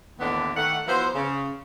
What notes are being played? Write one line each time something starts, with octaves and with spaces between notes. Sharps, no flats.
D#2 A2 D3 E3 B3 D4
D#3 A3 F#5
F3 F#3 B3 E4 C5
C#3